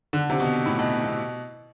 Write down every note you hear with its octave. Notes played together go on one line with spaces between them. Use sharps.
D3
C3
B2
A2
B2
B2